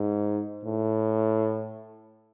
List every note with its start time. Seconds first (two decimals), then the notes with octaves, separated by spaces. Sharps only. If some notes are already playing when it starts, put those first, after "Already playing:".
Already playing: G#2
0.65 A2